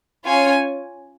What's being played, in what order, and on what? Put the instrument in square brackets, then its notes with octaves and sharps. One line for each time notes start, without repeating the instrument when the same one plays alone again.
[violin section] C#4 F4 C#5 G#5